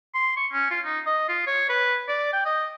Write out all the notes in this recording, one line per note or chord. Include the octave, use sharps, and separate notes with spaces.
C6
C#6
C#4
F4
D#4
D#5
F4
C#5
B4
D5
G5
D#5